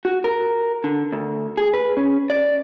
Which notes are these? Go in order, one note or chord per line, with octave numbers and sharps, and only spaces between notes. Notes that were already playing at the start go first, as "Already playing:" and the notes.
F#4
A#4
D3
D2
G#4
B4
C#4
D5